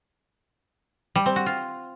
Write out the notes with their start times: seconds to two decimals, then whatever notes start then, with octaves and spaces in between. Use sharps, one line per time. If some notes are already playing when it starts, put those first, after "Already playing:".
1.15 G3
1.26 C4
1.36 F#4
1.46 F4